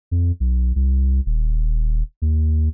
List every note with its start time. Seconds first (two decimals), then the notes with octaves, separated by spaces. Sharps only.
0.11 F2
0.40 B1
0.76 C2
1.26 D#1
2.22 D#2